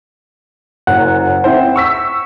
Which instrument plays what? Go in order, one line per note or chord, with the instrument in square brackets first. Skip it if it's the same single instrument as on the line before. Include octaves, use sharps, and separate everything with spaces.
[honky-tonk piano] F#1 F#2 [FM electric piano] F#5
[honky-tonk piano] C4 E4 C5
C#6 E6 B6